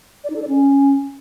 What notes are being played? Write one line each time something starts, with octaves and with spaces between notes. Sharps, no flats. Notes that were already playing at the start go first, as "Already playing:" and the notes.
D5
D#4
A4
D5
C#4